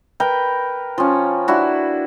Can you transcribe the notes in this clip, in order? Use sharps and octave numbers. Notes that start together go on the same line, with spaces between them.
A#4 B4 G5
F3 C#4
D4 E4 F#4